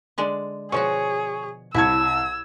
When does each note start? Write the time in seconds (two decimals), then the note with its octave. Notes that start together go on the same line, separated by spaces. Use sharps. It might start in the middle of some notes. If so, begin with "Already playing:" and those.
0.18 D3 G#3 D4
0.72 B2 F3 F#4 G#4 C#5 C#6
1.74 C2 E4 C#5 A5 E6 G#6